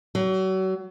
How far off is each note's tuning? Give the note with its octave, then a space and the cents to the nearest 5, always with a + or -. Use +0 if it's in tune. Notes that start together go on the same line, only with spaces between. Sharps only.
F#3 +35